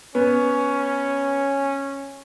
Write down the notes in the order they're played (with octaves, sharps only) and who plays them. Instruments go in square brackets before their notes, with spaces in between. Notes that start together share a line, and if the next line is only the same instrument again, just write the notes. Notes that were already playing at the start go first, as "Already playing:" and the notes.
[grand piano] B3 [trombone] C#4